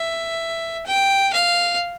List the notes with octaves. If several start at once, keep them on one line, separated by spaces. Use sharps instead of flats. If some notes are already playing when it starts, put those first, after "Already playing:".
Already playing: E5
G5
F5